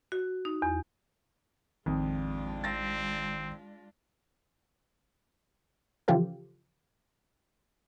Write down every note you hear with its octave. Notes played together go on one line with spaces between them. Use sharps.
F#4
D#4
E2
A1 F2 D#3 G#3 D4 F4
C4 A6 A#6
C#3 E3 F3 F4 G4 A4